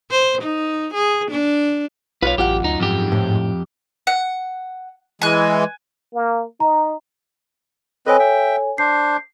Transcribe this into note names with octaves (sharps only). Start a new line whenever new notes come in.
C5
D#4
G#4
D4
B1 F4 B4 C#5 F5
A1 F#2 F4 G4 F#5
D2 D#4
F2 G#2 G4
A2
F#5
E3 G#3 G#5 F#6
A#3
D#4 A#5
C4 A4 B4 C#5 D#5 G#5
E5 G5
D4 C5 C7